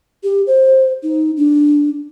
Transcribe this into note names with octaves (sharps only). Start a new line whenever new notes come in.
G4
C5
D#4
D4